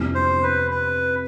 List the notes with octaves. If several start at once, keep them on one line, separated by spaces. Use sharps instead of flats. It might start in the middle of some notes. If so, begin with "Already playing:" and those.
Already playing: F2 C3 G3 B3 E4
C5
B4
B4